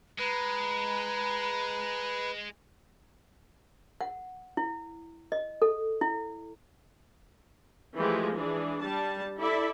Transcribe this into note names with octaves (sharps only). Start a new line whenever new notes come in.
G#3 B4 A#5 B5
F#5
E4
D#5
A4
E4
E3 F3 G#3 A3 G4
E3 D4 G#4
G3 A5
E4 A4 D5 E5 B5